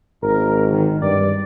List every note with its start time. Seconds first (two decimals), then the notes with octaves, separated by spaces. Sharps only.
0.22 G#1 A#4
0.72 D#3
1.02 G2 D5